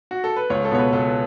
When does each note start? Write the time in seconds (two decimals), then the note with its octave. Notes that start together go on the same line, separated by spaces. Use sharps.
0.11 F#4
0.24 A4
0.36 B4
0.50 C#2 C#5
0.64 A4
0.71 B2 B3 C#5
0.79 B4
0.93 C#2 A4